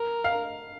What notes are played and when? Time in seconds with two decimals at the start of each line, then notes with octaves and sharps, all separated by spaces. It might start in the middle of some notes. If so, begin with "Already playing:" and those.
Already playing: A#4
0.24 F5